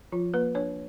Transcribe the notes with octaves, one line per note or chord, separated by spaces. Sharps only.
F3 F4
A#3 B4
D4 C#5